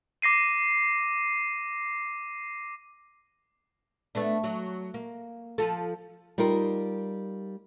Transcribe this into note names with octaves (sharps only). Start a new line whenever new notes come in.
D6 A#6 C7 D#7
A3 B3 D4
F#3
A#3
F3 F4 A4
G3 D#4 F4 A#4